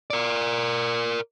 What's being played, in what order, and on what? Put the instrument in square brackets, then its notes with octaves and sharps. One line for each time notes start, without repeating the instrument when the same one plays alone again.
[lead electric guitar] A#4 D5